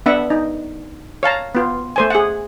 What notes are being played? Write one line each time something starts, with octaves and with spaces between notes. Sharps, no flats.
B3 D4 B4 E5 F#5
D#4
C#5 F5 A5 A#5
B3 F4
A3 C5 G#5
G#4 F#5